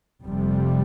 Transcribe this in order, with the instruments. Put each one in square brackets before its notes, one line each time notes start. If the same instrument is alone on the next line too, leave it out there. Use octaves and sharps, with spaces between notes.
[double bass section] F1 F2 C3 G3